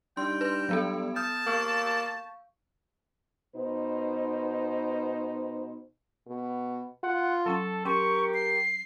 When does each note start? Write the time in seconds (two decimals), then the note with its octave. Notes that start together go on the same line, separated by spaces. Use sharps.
0.17 G3 D4 D#4 G5 C6
0.41 D4 B4 C6
0.69 F#3 B3 A4
1.16 A5 D#6 F6 G6
1.46 A#3 F5 C#6
3.55 B2 D#4 B4 C5
6.27 B2
7.04 F4 F#5
7.46 F#3 C#4 A4 A5
7.85 C#4 G4 A#4 C6 C#6
8.34 C7